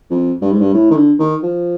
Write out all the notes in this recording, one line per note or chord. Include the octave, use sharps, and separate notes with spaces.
F2
G2
G#2
G2
A2
D#3
D3
D#3
F3